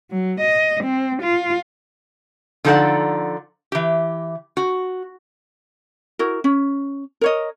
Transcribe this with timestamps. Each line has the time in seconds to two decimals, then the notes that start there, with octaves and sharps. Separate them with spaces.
0.11 F#3
0.41 D#5
0.84 C4
1.23 F4
2.65 D3 F3 D#4 A4 D5 F#5
3.72 E3 G4
4.57 F#4
6.19 E4 F#4 A#4
6.44 C#4
7.21 A#4 C#5 D#5